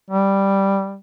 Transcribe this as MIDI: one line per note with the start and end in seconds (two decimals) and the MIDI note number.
0.10 0.97 55